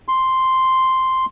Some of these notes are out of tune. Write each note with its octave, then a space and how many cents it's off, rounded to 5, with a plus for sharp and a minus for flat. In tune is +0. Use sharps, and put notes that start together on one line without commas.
C6 +0